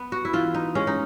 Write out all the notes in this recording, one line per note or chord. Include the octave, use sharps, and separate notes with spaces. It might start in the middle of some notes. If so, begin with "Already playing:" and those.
Already playing: B3
F#4
E4
E3 F4
D#4
G#3 C#4
D#4